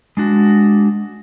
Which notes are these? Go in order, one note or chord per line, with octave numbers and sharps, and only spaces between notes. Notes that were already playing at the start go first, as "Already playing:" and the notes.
G#3 D4 F#4